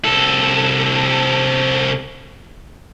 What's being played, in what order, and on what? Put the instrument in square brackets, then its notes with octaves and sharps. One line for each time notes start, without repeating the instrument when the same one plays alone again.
[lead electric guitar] C2 A4